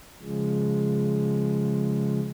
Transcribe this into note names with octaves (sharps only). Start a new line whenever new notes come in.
C#3 F3 G#3